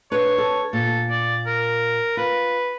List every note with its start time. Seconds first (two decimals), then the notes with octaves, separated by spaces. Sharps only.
0.11 D4 B4 C#5
0.38 A4
0.73 A#2 A4
1.10 D5
1.46 A#4
2.17 F4 B4